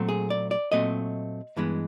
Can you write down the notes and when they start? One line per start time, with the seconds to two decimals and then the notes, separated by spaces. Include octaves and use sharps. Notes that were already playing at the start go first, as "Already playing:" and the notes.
Already playing: A#2 F#3 A3 C4
0.09 G#4
0.30 D5
0.51 D5
0.72 A#2 F#3 A3 C4 D#5
1.57 G2 E3 G#3 B3